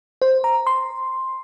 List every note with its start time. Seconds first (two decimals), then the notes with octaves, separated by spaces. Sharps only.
0.22 C5
0.44 A#5
0.67 C6